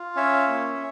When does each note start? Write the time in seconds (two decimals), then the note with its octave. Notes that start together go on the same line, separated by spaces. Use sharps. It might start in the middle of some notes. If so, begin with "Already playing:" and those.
Already playing: F4
0.16 C#4 C#5 E5
0.47 A#3